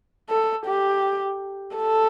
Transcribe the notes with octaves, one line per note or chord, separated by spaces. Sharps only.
A4
G4
A4